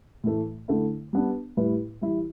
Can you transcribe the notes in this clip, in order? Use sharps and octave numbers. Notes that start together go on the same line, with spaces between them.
A2 E3 A3
D3 A3 E4
G3 B3 D4
A2 G3 E4 B4
E3 G3 E4